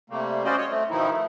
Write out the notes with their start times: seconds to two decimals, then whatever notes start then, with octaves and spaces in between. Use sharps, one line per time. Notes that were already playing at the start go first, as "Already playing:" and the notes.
0.10 C3 G3 A3 A#3
0.44 G3 C#4 F#4 C5 D5 D#5
0.57 C#5 D#5
0.70 A3 C4
0.91 B2 D#3 F3 D#4 E4
1.11 A3